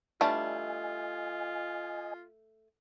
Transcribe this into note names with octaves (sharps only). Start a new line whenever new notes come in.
E3 G3 A3 D4 F4 D#5 G#5